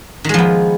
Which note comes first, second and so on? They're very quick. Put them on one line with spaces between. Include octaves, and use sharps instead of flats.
D#3 G#3 F3 B3